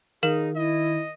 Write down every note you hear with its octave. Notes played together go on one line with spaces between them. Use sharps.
D#3 D#4 G#4 A#4 F5 E7
E4 D#5